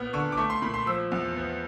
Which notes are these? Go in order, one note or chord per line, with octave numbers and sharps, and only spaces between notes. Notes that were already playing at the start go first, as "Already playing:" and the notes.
Already playing: A#2 B3 F6
D3 C#6
D6
A3 C#6
C6
A#2 B5
C6
F3 E6
E2
B3